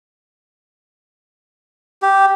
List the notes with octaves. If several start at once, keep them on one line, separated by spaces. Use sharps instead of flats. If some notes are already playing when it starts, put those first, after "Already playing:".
G4